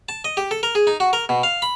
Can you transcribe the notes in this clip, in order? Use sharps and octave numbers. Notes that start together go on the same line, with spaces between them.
A5
D#5
G4
A4
A#4
G#4
D#4
F#4
A#4
B2
F5
B5